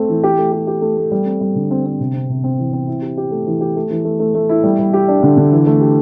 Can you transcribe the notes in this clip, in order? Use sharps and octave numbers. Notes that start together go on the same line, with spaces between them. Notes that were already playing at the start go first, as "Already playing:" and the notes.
Already playing: A3 C4
E3
G4
A3
G4
G4
A3
A3
G3
C4
G3
D3
C4
C4
C3
C4
C3
C4
E3
C4
E4
G4
G4
A3
E3
G4
A3
E3
A3
A3
A3
E4
G3
G3
G4
D4
D3
D3
E3
A3
G4